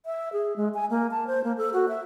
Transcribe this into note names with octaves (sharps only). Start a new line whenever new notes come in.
E5
G#4
G#3
G#5
A#3
A5
C5
A#3
A4
F#4
E5